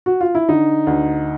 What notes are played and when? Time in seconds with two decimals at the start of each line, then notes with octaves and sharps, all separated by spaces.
0.06 F#4
0.21 F4
0.35 E4
0.48 D3 D#4
0.87 D2